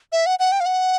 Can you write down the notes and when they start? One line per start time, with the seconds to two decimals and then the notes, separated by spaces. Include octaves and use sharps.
0.12 E5
0.26 F#5
0.39 F#5
0.52 G5
0.60 F5
0.66 F#5